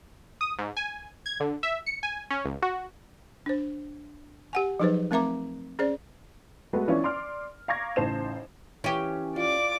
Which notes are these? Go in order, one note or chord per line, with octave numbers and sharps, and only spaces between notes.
D#6
G#2
G#5
G#6
D3
E5
C#7
G#5
C#4
C#2
F#4
D4 C5
G4 F#5 G#5
F3 F#3 D#4 G#4 B4 C5
A3 C4 A#4 E5 A#5 D6
C#4 G#4 C5 D5
G#3 A3 B3 F#4 B4
E3 B3 C#4 D4 E4 F4
D5 C6 D6 F6
F5 A#5 C#6 D6 G#6 A#6
A1 C#3 D#4 C5 A5 E7
E3 C#4 G4
F4 D5 D6